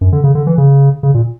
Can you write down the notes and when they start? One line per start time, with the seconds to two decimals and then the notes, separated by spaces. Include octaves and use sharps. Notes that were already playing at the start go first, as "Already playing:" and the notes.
0.01 F#2
0.12 D3
0.24 C#3
0.35 D3
0.47 E3
0.58 C#3
1.03 C#3
1.14 A#2